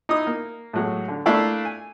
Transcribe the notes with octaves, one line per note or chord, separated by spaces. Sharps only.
D#4 E4 D#6
A#3
A2 F#3 G#3
D3
A3 A#3 D4 E4 D5 F5
G#5